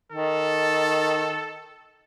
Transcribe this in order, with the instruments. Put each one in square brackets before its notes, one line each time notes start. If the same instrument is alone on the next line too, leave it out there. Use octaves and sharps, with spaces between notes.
[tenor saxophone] D#3 [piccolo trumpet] A4